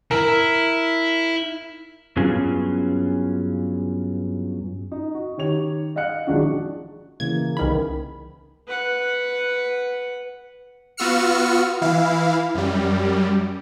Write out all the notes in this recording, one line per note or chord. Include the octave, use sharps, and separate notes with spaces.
E4 A#4
G2 F#3 B3 C#4 F4 G#4
D#4
F#4
D#3 G4 C#5 F7
D#5 F5 F#5 F#6 C#7
A#1 D#3 F#3 G#3 D4 F#4
C#3 E3 A#3 G#6
C2 D#3 B5
B4 F#5
B3 F4 F#4 E6 F6 C#7
E3 E4 F5
F#2 G3